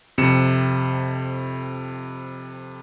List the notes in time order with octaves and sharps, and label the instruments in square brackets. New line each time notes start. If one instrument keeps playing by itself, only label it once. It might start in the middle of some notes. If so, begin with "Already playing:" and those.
[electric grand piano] F2 C3 C#7 E7